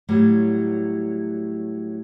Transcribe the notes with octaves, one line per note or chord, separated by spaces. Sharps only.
A2 F#3 G3